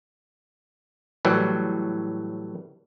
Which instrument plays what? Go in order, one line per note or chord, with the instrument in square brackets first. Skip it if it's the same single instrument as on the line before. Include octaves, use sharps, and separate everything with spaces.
[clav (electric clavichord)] A2 E3 F#3 G3